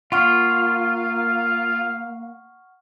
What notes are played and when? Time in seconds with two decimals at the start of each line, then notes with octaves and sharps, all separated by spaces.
0.12 A#3 F4 F5 F#5 C#6 F6